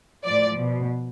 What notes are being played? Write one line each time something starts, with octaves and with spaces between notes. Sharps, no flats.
A2 F3 D5
B2